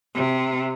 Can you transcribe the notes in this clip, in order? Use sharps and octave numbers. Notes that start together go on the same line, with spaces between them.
C3